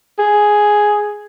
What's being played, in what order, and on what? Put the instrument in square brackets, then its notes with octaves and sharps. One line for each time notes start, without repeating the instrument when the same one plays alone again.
[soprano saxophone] G#4